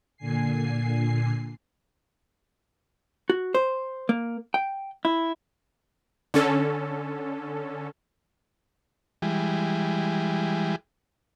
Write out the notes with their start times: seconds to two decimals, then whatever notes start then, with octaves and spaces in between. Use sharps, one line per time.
0.17 A#2 D3 G#5 C7
3.30 F#4
3.55 C5
4.09 A#3
4.54 G5
5.05 E4
6.34 D3 C#4 A4
9.22 E3 G3 G#3